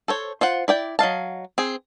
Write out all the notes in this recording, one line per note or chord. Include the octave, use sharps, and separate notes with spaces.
A4 C5 C#5
F4 C5 F#5
E4 D5 G5
F#3 D#5 F5 A5
C4 G#4